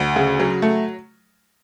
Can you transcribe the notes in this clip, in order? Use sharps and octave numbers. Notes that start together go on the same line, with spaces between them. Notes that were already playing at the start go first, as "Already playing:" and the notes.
Already playing: D2
C#3
F#3
A3